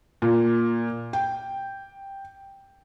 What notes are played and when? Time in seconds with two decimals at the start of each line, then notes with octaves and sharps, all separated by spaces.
0.22 A#2
1.13 G5